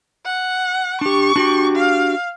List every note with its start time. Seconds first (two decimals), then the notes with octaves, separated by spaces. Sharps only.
0.25 F#5
1.01 D4 G4 C#6
1.36 D4 F#4 G4
1.75 F5